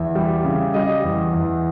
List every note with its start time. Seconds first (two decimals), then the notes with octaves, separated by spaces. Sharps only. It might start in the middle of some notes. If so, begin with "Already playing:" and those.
Already playing: E2 E5
0.15 G3
0.45 C#3
0.74 G3 D#5
1.04 E2
1.33 E2